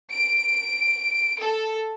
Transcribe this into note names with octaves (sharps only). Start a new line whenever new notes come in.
D7
A4